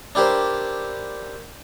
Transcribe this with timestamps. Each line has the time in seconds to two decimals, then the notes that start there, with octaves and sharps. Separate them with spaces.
0.15 D4 E4 G4 A#4 C5